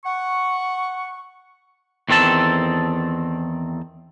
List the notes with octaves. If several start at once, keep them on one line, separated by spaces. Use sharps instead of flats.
F#5 C#6
E2 D#3 C4 A4 A5